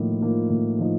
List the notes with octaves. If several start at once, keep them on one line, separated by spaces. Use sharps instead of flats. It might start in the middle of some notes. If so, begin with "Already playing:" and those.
Already playing: A2 F3 A#3 D#4
F3 A#3 D#4
A2
F3 A#3 D#4